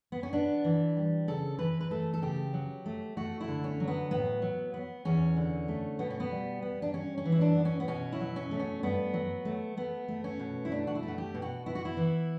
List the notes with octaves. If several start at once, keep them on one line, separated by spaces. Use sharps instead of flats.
B3
C#4
B3 D4
E3
G3
C#3 A4
E3 B4
B4
A3 A4
A4
C#3 G4
F#3
A3
A3 F#4
E4
D3
C#4
F#3
B3
A2 B3
F#3
B3
E2 C#4
D3
A3
B2 B3
C#4
B3
G3
B3
D4
G2 C#4
C#4
E3
E4
D4
B3
C#4
B3
B2 C#4
E4
F#3
C#4
A3
C#4
G2 B3
F#3
A3
A3 B3
A3
C#4
B2
E4
A3 D4
F#4
E4
A3
F#4
G4
B2
F#4
B3 E4
F#4
E4
E3